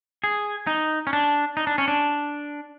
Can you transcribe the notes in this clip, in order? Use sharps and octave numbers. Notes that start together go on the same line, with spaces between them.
G#4
D#4
C#4
D4
D#4
D4
C#4
D4